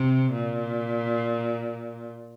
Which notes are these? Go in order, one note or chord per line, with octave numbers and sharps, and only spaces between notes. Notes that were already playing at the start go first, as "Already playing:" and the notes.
Already playing: C3
A#2